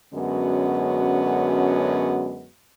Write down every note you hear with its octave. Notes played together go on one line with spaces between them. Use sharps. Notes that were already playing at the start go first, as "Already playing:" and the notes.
F#2 D3 G#3 B3 C#4 F#4